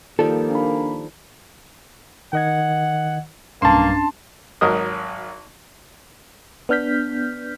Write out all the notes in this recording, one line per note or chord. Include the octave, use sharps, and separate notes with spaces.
D#3 F3 G3 A#3 A4
D4 B5
D#3 D#5 F#5 G#6
B1 G2 A#3 C#4 D4 A5 C6
G#1 F#3 A#4 D#5 D#6
B3 D4 F6 G6 B6